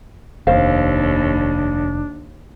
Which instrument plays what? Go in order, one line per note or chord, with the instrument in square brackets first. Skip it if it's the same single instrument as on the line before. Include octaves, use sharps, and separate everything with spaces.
[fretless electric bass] F1 [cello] D#2 [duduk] D4 [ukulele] C5 F5